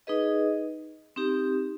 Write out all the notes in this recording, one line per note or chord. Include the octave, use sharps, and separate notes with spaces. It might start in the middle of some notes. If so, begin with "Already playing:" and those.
D#4 G#4 B4 D#5
C4 D#4 G4